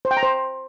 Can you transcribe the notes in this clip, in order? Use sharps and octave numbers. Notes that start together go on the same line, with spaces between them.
C5
G5
A#5
C5